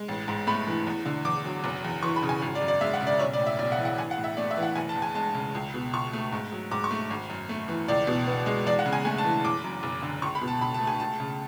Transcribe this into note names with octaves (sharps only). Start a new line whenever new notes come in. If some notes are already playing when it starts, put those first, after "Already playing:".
Already playing: G#3
A1
G#2
A3 B5
E3
E2
D3
E2 D6
F#3
F#1
E2
E3 C#6
B5
C#3
G#5
G#1
D5
F#2
D5
G#3 E5
F#5
C#3
D5
B1 C#5
D5
A2
E5
B1 D5
F#5
E3
F#5
A1 G#5
F#5
A2
E5
A3 D5
E5
E3
F#5
F#1 G#5
A5
E2
G#5
G#3 A5
C#3
C#2
B2
C#2 C#6
A3
G#2
F#3
G#2 D6
C#6
A3
G#1
F#2
A3
E3
C#2 D5
B2
B3
G#3
E2 D5
F#5
C#3
G#5
A3 G#5
A5
E3
F#1 D6
F#2
F#1
D3
C#2 C#6
B5
B2
A5
C#2 B5
A5
A3
G#5
C#2 A5
C#3